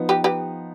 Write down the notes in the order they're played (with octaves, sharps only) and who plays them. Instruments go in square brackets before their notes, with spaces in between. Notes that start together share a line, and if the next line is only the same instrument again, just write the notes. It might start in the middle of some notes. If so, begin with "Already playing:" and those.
Already playing: [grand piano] F3 B3 D#4
[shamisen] G4 B4
G4 B4